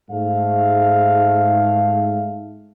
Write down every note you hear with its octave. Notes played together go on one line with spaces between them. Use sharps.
G#2 A3 F5